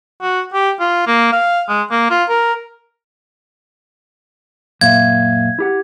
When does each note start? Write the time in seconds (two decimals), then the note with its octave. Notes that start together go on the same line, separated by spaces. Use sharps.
0.22 F#4
0.54 G4
0.80 F4
1.07 A#3
1.33 F5
1.69 G#3
1.91 A#3
2.10 F4
2.29 A#4
4.81 F#2 A#2 E5 F5 G#6
5.59 E4 G4 F#5